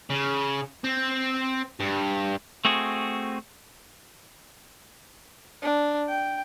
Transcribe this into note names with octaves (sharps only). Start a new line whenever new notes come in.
C#3
C4
G2
A3 C4 F#4 G#4
D4
G5